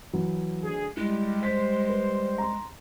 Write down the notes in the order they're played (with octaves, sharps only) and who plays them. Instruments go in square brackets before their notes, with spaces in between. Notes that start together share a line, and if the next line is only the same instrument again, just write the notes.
[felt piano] E3 F#3
[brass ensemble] D2 G#4
[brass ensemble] G3 [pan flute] G#3 [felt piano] E4
[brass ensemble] G3 C5 [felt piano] B6
[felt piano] B4
A#5 C6